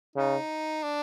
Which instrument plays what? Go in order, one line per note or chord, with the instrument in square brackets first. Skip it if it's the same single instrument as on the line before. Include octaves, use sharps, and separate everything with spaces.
[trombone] C#3 [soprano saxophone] D#4
[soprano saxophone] D4